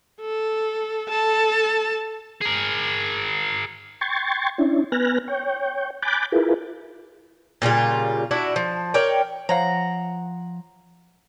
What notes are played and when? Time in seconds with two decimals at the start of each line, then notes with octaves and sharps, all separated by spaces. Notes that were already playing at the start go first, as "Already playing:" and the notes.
0.21 A4
1.09 A4 A5
2.41 G#4 A#4
4.01 G5 C6 C#6 G#6 A6
4.58 C#4 D4 E4
4.92 B3 B4 G#5 F6 F#6 A#6
5.28 C#5 G5
6.02 G#5 B5 D6 F#6 G6 A6
6.32 E4 F4 G#4 A#4 B4
7.62 A#2 C#3 G3 F4
8.31 D4 E4 F#4
8.56 F3
8.94 A#4 C#5 D5 G5
9.49 F3 C5 C#5 F5 F#5 A#5